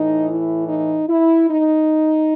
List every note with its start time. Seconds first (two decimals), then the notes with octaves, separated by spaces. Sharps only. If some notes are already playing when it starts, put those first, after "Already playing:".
Already playing: A2 E3 D#4
0.29 E4
0.69 D#4
1.09 E4
1.50 D#4